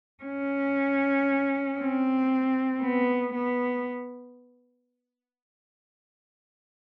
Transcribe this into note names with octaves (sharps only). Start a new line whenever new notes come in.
C#4
C4
B3
B3